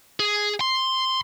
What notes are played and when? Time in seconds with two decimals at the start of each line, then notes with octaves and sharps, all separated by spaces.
0.20 G#4
0.61 C6